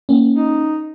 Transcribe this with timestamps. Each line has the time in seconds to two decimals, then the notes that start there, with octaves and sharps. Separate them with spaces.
0.09 A#3 C#4
0.33 D#4